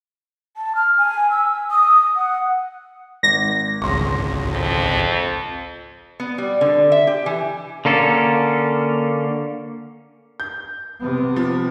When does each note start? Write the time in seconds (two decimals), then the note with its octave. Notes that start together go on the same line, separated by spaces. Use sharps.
0.57 A5
0.76 F6
0.98 G#5
1.30 E6
1.71 D#6
2.16 F#5
3.23 G#1 A#6
3.82 G#1 C#2 C6 C#6
4.49 F2
6.20 B3
6.38 G3
6.61 D3
6.92 E5
7.07 G4
7.26 E3
7.85 D3 A#3 C#4 A4
10.40 G6
11.00 C3 B3
11.36 F3